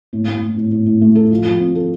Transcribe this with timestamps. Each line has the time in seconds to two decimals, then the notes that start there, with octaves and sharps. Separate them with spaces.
0.13 A2
0.28 A2
0.42 A2
0.57 A2
0.72 A2
0.86 A2
1.01 A3
1.15 A4
1.31 F3
1.45 F3
1.60 C4
1.75 A4